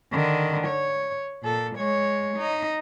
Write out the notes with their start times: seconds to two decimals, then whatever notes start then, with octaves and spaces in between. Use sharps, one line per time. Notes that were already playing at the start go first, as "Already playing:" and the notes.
0.12 D3 D#3
0.67 C#5
1.43 A#2 A4
1.76 G#3 C#5
2.37 D#4